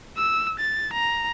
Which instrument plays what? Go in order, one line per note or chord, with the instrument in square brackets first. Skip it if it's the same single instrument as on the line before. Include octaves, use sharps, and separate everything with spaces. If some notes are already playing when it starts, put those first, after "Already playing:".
[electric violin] E6
A6
A#5